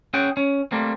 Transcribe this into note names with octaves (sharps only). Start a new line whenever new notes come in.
C#4 G#4 F#5 G5
C#4
G3 A3 A#3 C4